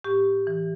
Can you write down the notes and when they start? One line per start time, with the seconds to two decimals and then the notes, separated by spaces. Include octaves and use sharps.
0.04 A2 G4
0.47 E3